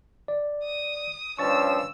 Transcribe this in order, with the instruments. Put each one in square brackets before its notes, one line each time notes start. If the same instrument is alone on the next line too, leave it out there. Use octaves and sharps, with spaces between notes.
[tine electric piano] D5
[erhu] D#6
[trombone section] G2 F3 C#4 [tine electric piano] C#6 A6 [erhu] E6